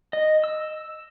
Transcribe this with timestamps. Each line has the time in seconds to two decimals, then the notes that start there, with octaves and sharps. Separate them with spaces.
0.13 D#5
0.44 E6